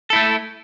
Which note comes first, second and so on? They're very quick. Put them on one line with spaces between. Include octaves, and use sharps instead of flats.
A4 E4 A3